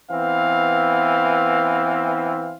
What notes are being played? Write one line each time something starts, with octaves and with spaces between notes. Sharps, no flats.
E3 B3 C4 F5